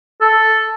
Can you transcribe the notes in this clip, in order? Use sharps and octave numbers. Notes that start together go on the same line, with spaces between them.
A4